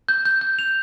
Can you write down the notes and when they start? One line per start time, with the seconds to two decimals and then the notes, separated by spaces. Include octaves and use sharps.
0.09 G6
0.26 G6
0.41 G6
0.59 F7